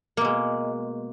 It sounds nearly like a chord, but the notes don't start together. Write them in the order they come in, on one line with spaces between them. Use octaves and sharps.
A#3 B2 G#3